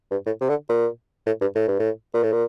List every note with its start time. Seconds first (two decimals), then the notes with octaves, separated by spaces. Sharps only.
0.11 G2
0.26 A2
0.41 C3
0.49 D3
0.69 A#2
1.26 A2
1.41 G2
1.55 A2
1.68 G2
1.79 A2
2.14 A#2
2.23 A2
2.32 A#2